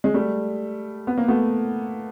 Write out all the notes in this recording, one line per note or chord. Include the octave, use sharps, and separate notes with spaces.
G#3
G3 A3
B3
A#3
A3 B3